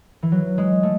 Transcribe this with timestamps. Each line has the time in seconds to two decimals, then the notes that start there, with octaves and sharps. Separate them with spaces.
0.22 E3
0.32 F#3
0.58 G#3
0.83 A3